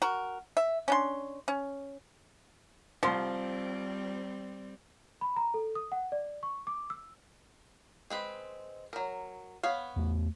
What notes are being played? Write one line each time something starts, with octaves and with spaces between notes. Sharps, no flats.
F#4 A#4
E5
C#4 D4 C6
C#4
C2 F3 G3 C4 C6
B5
A#5
A4
D#6
F#5
D5
C#6
D6
E6
G#3 C4 B4
F#3 A#4
B3 C#5 F5
E2 A3